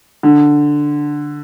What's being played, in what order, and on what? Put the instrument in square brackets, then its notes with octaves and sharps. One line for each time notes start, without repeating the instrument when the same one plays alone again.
[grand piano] D3